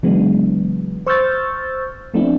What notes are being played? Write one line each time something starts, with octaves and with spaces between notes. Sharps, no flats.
C#3 E3 F#3 G#3 B3 D4
C5 C#6 E6 F6 G6 A6
F3 A3 B3 C4 D4 E4